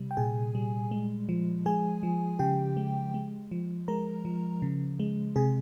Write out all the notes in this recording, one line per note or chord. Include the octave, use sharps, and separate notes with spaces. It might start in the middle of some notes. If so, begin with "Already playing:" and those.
Already playing: C3 G3
G5
A#2 G#4 G#5
G3
G#3
F3
G#3 G#4 G#5
F3
C#3 G4 G5
G#3
G#3
F3
G#3 A#4 A#5
F3
C#3
G#3
C3 G#4 G#5